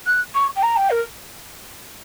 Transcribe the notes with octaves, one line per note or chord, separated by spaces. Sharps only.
F#6
C#6
G5
A#5
G5
A#4